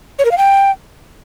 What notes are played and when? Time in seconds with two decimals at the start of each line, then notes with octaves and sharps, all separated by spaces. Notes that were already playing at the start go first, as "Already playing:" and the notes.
0.19 C#5
0.25 A#4
0.31 F5
0.38 G5